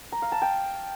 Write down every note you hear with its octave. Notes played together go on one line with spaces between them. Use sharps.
A#5
F5
A5
G5